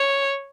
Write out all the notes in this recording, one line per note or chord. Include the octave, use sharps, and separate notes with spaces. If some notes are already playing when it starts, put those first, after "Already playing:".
Already playing: C#5